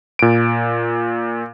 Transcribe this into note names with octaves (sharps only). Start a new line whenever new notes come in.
A#2 D7